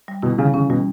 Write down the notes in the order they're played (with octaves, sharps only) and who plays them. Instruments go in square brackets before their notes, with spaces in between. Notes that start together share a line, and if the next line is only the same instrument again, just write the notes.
[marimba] G3
[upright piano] B2 [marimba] E4
[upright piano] C#3 [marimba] E3
[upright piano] C#3 [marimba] C#4
[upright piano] B2 [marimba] G3